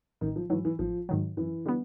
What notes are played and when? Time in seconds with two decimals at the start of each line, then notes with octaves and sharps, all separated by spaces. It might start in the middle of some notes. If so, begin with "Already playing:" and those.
0.21 A1 D#3
0.36 F3
0.50 G#2 D#3 E3 F#3
0.65 E3
0.79 A1 F3
1.09 G#2 D#3 F#3
1.37 F#2 E3
1.66 D3 G3 B3